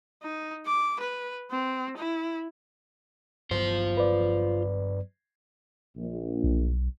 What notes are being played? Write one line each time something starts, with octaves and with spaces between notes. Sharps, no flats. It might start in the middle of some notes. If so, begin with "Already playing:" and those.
D#4
D6
B4
C4
E4
G2 F#3 B3 F4 C5
B4 D5
A#1
B1